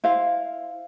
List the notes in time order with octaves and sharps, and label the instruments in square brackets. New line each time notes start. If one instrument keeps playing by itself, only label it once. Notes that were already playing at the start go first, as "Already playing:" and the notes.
[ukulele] E4 C5 F5